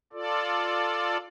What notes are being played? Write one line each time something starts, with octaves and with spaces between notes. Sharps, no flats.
F4 A4 D5